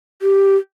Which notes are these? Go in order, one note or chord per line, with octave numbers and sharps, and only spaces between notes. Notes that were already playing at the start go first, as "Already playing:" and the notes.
G4